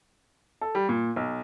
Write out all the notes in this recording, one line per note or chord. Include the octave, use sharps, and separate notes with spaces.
A4
G3
A#2
B1